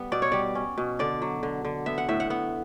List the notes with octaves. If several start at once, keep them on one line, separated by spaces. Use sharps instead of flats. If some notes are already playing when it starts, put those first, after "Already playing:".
Already playing: G3 B3
B2 D5
C#5
G3 D5
C#4
B2
D3 D5
F#3
D3
D3
B3 E5
F#5
A2 E5
F#5
B3 F#5